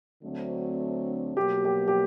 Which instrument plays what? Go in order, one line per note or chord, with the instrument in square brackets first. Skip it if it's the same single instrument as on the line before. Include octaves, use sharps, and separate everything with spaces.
[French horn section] D2 D3 F#3 A3 C4
[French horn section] B2 F#3 A#3 [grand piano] G4
[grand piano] G4
G4